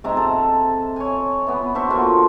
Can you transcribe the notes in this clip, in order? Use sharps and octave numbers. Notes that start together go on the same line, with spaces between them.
G#2 C3 E5 A#5
A4
C#5 G#5
E3 B3
D4 F#4 C5 E5
D3 A#3 F4 F#4